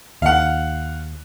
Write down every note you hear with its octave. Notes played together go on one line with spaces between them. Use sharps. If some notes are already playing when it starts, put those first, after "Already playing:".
D#2 F5 F#5